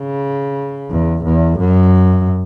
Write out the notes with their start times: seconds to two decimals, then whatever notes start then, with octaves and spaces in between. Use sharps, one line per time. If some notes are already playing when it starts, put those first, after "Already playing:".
Already playing: C#3
0.91 E2
1.25 E2
1.60 F#2